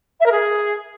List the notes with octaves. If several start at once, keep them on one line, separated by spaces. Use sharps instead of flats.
E5
A#4
G#4